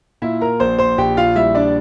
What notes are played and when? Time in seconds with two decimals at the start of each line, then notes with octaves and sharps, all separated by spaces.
0.22 A#2 E4 E5
0.41 A#4 A#5
0.60 A#1 C5 C6
0.79 C5 C6
0.98 A#1 G4 G5
1.17 F4 F5
1.36 G3 E4 E5
1.55 D4 D5